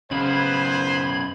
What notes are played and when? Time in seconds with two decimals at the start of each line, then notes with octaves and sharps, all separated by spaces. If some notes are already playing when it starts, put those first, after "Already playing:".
0.11 F#2 C#3 B3 B4 C5 F5 B5 G#6